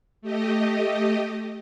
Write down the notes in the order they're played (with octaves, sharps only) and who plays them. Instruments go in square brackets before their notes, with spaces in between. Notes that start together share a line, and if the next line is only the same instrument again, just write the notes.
[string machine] A3 G4 D#5